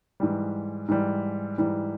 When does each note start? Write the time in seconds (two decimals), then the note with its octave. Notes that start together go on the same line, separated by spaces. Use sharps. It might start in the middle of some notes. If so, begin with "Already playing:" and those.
0.20 G#2 E3 G3
0.88 G#2 E3 G3
1.58 G#2 E3 G3